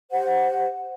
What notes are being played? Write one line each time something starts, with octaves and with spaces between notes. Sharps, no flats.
G4 C5 F#5